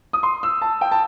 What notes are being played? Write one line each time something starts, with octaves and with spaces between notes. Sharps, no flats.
D#6
C6
E6
A5
G5
A5